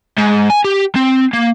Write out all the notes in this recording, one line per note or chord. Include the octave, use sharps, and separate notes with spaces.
G#2
G#5
G4
C4
A#3